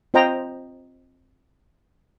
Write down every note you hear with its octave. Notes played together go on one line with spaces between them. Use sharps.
C4 F4 C5 D#5 G5 A#5